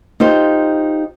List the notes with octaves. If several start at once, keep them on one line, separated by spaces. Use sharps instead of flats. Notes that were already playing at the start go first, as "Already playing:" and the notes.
D#4 F4 G4 C5